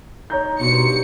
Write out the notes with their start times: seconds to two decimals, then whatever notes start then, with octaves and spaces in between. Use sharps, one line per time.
0.30 D#4 C#5 A#5 G6
0.60 G2 B2 F#3 C6 C#7